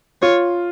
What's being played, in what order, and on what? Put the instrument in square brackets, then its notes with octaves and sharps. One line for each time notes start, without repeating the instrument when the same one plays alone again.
[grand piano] F4 [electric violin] C#5